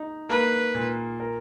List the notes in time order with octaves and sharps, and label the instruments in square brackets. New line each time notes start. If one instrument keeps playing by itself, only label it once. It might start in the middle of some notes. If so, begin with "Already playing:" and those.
Already playing: [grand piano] D#4
[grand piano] A#3 [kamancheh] B4
[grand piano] A#2
A#4